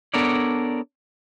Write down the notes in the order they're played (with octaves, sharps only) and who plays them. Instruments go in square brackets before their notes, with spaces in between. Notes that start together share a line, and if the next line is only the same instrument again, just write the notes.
[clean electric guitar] B3 D4 A4 A#4 C#5 D5